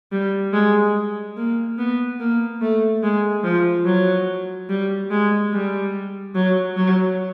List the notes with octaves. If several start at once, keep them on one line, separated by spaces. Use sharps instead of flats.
G3
G#3
A#3
B3
A#3
A3
G#3
F3
F#3
G3
G#3
G3
F#3
F#3